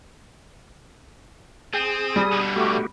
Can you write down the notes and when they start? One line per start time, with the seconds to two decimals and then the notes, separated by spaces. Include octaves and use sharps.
1.74 C4 G#4 D#6
2.16 G3
2.32 B2 D3
2.56 A3 F#4 G4